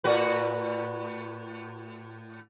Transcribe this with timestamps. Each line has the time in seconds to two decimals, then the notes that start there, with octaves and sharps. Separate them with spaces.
0.04 A2 F#4 B4